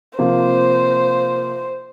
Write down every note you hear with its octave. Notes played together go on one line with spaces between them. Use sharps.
C3 F3 A#3 F4 C5